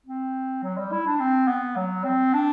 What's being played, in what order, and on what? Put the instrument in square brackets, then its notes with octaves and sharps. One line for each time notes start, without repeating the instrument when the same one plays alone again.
[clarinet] C4
F#3
G3
E4
D4
C4
B3
F#3
C4
D4